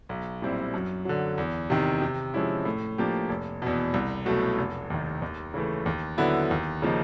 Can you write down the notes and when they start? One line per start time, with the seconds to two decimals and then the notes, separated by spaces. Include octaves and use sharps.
0.09 B1
0.42 A#2 G3 C4 E4
0.74 F#2
1.05 D3 F#3
1.38 E2
1.70 C3 D#3
2.02 C3
2.34 F3 G#3 C#4 E4
2.65 A2
2.98 F3 A#3 D4 G4
3.29 F1
3.62 E2 B2
3.94 C2
4.26 B2 F#3 A3
4.58 F1
4.90 D#2 D#3
5.22 D#2
5.54 C#3 E3 A3
5.86 D#2
6.18 D3 F#3 B3 E4
6.51 D#2
6.82 C#3 F3 A#3 D#4